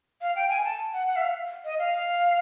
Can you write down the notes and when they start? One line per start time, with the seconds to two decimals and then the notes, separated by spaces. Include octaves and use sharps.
0.21 F5
0.36 G5
0.49 G#5
0.64 A5
0.93 F#5
1.07 F#5
1.16 E5
1.22 F5
1.65 D#5
1.79 F5